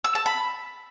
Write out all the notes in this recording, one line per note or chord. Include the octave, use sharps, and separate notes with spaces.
E6
A5
B5